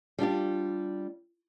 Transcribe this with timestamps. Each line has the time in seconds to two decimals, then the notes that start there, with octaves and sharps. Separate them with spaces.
0.19 G3 D4 F4 G4